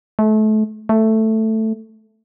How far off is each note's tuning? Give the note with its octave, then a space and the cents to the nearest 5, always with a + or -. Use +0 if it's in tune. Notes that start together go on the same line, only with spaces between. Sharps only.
A3 -30
A3 +5